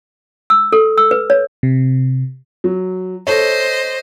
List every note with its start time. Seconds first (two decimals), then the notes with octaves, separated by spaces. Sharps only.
0.50 E6
0.73 A4
0.98 E6
1.11 B4
1.30 C#5
1.63 C3
2.64 F#3
3.27 A4 C5 C#5 D#5